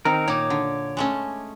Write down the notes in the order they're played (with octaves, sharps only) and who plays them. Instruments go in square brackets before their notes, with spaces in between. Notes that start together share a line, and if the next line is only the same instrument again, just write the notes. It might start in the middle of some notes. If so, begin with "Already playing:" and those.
[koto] D#3 [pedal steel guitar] C4 D#4 A#4
[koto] A#2 D#4 [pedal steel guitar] C#5 D6
[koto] D3
G#3 A3 C#4